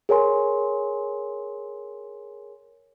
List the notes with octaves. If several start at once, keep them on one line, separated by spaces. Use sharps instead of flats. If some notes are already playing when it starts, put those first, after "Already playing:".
G#4 A#4 C#5 G#5 C6